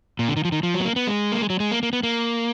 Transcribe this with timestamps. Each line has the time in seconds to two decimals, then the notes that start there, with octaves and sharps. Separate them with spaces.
0.19 A#2
0.28 D3
0.37 D#3
0.45 F3
0.52 D#3
0.63 F3
0.75 F#3
0.80 B3
0.85 A#3
0.96 B3
1.07 G#3
1.32 A#3
1.41 G#3
1.50 F#3
1.60 G#3
1.71 A#3
1.83 A#3
1.93 B3
2.03 A#3